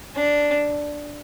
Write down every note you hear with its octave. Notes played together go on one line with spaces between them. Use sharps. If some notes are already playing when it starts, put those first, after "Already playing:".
D4